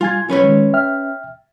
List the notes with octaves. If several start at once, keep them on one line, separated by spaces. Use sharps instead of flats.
G3 F4 G#5 G#6
F#3 C#4 B4 C#5
D#3 G#3
E5 G5 F6